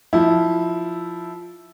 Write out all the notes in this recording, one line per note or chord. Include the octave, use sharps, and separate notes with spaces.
F3 E4